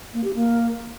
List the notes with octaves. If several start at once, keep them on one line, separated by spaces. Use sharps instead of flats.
A#3
G4
A#3